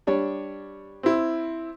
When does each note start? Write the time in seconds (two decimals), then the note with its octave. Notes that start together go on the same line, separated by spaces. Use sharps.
0.07 G3 D4 C#5
1.03 C4 E4